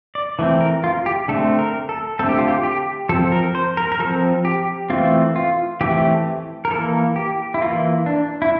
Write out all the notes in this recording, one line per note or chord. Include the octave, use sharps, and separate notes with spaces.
D5
E3 A3 C4
A#4
F4
G4
D3 A3 C4 A4
A#4
A4
D3 A3 C4 A4
G4
F4
G4
G4
F3 C4 A4
A#4
C5
A#4
A#4
F3 C4 A4
G4
E3 A3 C4 F4
F4
E3 A3 C4 G4
A#4
E3 A#3 A4
G4
E4
E3 A#3 F4
D4
E4